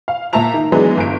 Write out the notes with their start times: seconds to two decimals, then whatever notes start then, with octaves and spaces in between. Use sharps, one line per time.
0.08 F5
0.33 A#2 E5 A5 A#5 F7
0.54 D#3
0.72 E3 F#3 G#3 B3 D4
0.97 G1 D7